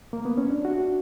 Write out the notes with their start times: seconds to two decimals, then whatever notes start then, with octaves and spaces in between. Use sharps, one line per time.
0.13 A#3
0.25 B3
0.38 C#4
0.50 D4
0.65 F#4